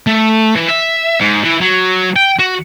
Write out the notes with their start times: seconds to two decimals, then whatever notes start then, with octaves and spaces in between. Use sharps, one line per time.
0.07 A3
0.55 E3
0.69 E5
1.20 G#2
1.44 E3
1.61 F#3
2.16 G5
2.39 F#4